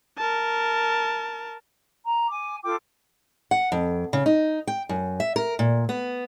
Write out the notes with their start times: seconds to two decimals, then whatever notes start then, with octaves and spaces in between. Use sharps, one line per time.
0.17 A#4 A5
2.04 A#5
2.28 G#5 D6
2.63 F4 A4 G5 D6
3.51 F#5
3.72 F2
4.13 C#3
4.26 D#4
4.67 G5
4.89 F#2
5.20 E5
5.36 A#4
5.59 A#2
5.89 B3